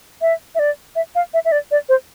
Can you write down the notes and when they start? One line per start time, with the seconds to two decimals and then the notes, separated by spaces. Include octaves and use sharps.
0.21 E5
0.55 E5
0.59 D5
0.95 E5
1.15 F5
1.34 E5
1.45 E5
1.52 D5
1.71 D5
1.89 C5